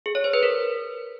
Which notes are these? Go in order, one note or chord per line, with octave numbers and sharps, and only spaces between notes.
G#4
C#5
C5
B4
A#4